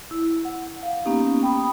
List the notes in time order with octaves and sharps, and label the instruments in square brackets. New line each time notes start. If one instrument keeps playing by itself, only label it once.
[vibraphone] E4
F#5
F5
A#3 B3 C#4 D#4 G4
G5 B5 D#6